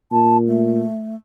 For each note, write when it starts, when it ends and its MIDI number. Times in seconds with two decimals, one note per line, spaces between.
0.12 0.84 46
0.12 0.37 81
0.47 1.15 57